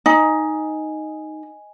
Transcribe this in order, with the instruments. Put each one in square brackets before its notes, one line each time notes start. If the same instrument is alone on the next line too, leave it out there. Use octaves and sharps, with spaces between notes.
[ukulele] D#4 [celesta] D#5 G#5